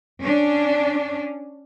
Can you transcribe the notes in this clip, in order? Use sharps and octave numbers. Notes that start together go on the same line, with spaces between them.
C#4 D4